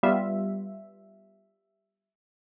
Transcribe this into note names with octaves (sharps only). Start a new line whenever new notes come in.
G3 B3 F4 E5